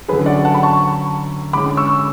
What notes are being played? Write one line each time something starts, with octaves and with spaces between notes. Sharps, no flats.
D3 F#3 C#4 G#4 B4
D5 F#5
F#5 A5
B5
A5 C#6
D3 G#3 C#4 B5 D6
C#6 E6